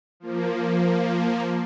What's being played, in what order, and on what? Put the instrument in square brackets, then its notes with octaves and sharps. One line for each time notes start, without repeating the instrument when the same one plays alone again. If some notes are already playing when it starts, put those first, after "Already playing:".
[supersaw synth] F3 A#3